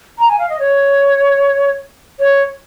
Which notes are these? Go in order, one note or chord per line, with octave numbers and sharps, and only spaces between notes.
A#5
G#5
F5
D#5
C#5
C#5